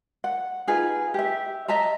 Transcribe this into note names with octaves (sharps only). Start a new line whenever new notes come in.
F#5
D#4 F4 G#4 B4
G4 E5
D#5 E5 A5 A#5